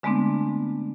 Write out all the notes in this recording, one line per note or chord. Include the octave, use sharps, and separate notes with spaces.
D3 G#3 A3 B3 C4 D4